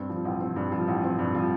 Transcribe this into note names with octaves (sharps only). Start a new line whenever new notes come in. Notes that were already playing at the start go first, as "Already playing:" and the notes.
Already playing: G2 C4
F3
A1
C4
G2
F3
A1
C4
G2
F3